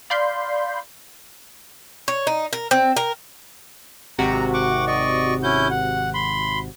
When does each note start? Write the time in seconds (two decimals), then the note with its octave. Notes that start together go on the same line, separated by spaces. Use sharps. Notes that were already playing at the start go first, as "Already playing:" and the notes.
0.10 D5 F5 B5 C6 G6
2.08 C#5
2.27 D#4
2.53 A#4
2.71 C4
2.97 A#4
4.19 G#1 C3 F#4 A#5
4.54 F#5 C#6 D6
4.88 D5 D#5 C#6
5.43 C#4 E4 G6
5.71 F#5
6.14 B5 C6